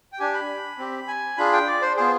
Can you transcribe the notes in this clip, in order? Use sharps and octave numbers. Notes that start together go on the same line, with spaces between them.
G5
D4 G4 G#5
B5
C4 G4
G#5
D4 F4 G#4 B5
G5
D5
C5
B3 F4 G#4 C5